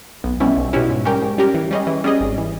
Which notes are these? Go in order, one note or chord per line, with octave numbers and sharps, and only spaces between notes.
B1
B2 G3 C#4 E4
B1
B2 G3 C#4 E4
G#2
G3 C#4 G4 A#4
G#2
G3 C#4 G4 A#4
E3
G3 C#4 G#4 D#5
E3
G3 C#4 G#4 D#5
G#1
E3